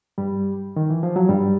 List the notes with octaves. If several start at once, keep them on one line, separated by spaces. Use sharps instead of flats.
G2 G3
D#3
E3
F3
F#3
G2 G3